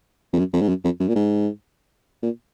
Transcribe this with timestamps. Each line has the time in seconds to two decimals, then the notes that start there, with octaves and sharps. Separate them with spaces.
0.33 F2
0.39 F#2
0.53 F2
0.61 G#2
0.69 F#2
0.84 F2
1.00 F#2
1.08 A#2
1.16 G#2
2.23 A#2